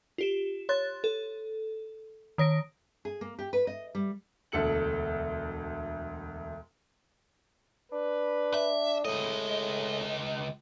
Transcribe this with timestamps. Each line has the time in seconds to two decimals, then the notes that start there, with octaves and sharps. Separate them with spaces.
0.18 F4 G4 E7
0.69 C#5 C6 F#6 A6
1.04 A4
2.38 D#3 C#5 A#6 D7
3.05 G#4
3.21 A#3
3.39 G4
3.53 B4
3.67 D#5
3.95 G3
4.52 E1 D2 A4 C#7 F#7
7.92 D4 B4
8.54 E5
9.05 C#2 A2 G#3 D#5